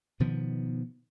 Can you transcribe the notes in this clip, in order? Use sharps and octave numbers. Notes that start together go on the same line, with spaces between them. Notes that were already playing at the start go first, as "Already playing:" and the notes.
B2 D#3 F3 B3